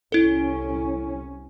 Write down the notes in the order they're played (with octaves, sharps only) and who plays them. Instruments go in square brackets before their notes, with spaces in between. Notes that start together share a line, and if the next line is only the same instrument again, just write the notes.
[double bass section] C2 C#4 [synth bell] E4 A4